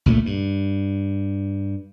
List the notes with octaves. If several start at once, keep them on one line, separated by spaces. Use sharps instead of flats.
C#2 A#2 G#3 A3
G2